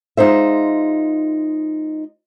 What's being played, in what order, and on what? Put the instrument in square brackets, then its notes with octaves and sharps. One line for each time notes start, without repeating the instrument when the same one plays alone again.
[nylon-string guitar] G#3 D#4 F4 C5 E5